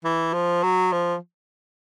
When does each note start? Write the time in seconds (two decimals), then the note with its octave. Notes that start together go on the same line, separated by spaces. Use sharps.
0.05 E3
0.33 F3
0.63 F#3
0.92 F3